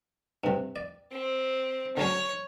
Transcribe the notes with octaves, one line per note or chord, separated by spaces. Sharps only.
G2 C3
D5
C4
D3 F#3 C#4 C#5